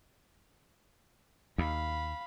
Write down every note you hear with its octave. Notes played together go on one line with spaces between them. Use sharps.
D#2 F5 B5